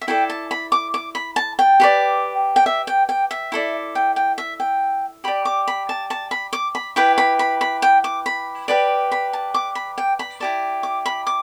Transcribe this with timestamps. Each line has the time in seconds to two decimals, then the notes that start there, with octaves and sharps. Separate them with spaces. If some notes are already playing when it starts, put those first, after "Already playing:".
0.01 E5
0.08 E4 A4 D5 G5
0.30 A5
0.51 B5
0.72 D6
0.94 D6
1.15 B5
1.36 A5
1.59 G5
1.80 G4 B4 D5
2.56 G5
2.66 E5
2.87 G5
3.09 G5
3.31 E5
3.52 E4 A4 D5
3.95 G5
4.16 G5
4.38 E5
4.60 G5
5.24 G4 D5 B5
5.45 D6
5.68 B5
5.89 A5
6.10 A5
6.31 B5
6.53 D6
6.75 B5
6.96 E4 G4 B4 G5
7.18 B5
7.39 B5
7.61 B5
7.82 G5
8.04 D6
8.26 B5
8.68 G4 B4 D5
9.12 B5
9.33 A5
9.54 D6
9.75 B5
9.98 G5
10.19 B5
10.40 E4 G4 D5 A5
10.83 D6
11.06 B5
11.27 D6